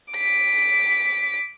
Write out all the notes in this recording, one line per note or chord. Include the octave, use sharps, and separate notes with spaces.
D6 B6